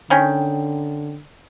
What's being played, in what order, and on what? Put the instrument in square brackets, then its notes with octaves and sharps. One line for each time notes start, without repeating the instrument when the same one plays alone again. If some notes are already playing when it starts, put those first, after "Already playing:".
[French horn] D3 [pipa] D#3 C#4 G5